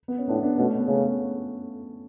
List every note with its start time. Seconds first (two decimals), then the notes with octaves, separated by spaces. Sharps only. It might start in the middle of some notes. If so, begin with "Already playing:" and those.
0.08 B3
0.18 C#4
0.28 A2 B3 D4
0.43 B3 D4
0.58 B2 A3 C#4
0.78 B3
0.87 C#3 A3 C#4